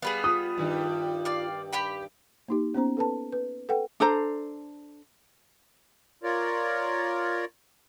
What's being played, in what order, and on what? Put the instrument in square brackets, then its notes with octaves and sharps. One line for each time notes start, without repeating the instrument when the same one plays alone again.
[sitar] G3 B3 [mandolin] G#4 B4 F5
[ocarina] F4 [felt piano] D#6
[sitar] G2 D#3 G3
[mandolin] D5 F5
G4 G5 B5
[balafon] A#3 D#4 G4
B3 C#4 C5 A#5
A4 B4 A5
B4
A4 B4 F#5 G5
[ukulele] D4 A4 C5 A#5
[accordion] F4 A#4 C#5 D5